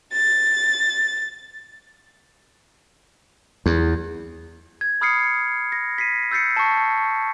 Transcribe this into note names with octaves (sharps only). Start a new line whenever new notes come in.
A6
E2
G#6
B5 D#6 F6 G#6 C7 C#7
A#6
B6 C7 D#7
E6 G6 A6 C7 C#7
A5 C#6